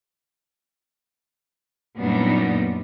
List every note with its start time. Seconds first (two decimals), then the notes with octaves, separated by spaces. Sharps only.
1.97 F#2 A#2 G3 B3 D4 D#4